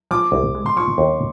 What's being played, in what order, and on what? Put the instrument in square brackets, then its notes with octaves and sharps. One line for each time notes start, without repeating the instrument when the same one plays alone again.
[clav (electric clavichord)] F3 [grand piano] D6
[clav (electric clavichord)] C2
G#3
[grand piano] C6
[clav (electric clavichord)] F3 [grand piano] C#6
[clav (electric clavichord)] D#2